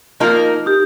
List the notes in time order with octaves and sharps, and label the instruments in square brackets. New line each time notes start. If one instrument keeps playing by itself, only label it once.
[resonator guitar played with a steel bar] F3 A#3 D#4 A#4 [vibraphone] F4
[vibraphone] D#4 G4